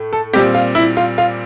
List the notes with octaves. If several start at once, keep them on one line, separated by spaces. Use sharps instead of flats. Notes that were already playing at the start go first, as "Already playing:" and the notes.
Already playing: A2 A3
A4
A#2 G3 C4 G4
F4
E4
F4
F4